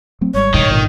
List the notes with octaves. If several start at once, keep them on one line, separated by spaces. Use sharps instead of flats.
F#3 A3 C4
G#1 G3 C#5
G#2 B2 D#3
G#1 A#2 D3